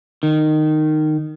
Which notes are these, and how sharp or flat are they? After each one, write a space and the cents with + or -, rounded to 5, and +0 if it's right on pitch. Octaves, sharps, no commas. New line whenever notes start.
D#3 -15